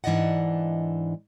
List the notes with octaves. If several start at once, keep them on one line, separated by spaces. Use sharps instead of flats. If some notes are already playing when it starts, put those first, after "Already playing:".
G#2 E3 D4 D5 D#5 F#5